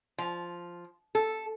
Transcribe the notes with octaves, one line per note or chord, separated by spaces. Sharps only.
F3
A4